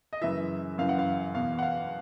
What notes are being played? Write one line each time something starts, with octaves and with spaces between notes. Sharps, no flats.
D#5
F#2 C#3 E3 E5
F#2 C#3 E3 F5
F#5
F5
E2 B2 F5
F#5
F5